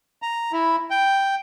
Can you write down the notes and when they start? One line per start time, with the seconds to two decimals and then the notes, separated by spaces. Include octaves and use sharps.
0.22 A#5
0.52 E4
0.91 G5